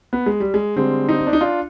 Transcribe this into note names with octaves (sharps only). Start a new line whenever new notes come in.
B3
G#3
G3
G#3
D3 G3 G#3 C4
C4 D#4
C4
D4
D#4
D4 F4